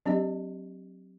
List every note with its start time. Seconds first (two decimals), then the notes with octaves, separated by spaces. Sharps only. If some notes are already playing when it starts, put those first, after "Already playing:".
0.06 F#3 C4 D4 G4 D#5